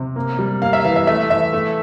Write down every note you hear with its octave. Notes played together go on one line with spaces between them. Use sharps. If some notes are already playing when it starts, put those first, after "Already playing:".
Already playing: C3
A#3
G3
A#3 F5
E5
E3 F5
E5
A3 E5
E3 E5
A3